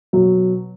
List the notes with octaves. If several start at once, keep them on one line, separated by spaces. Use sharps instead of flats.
B2 F#3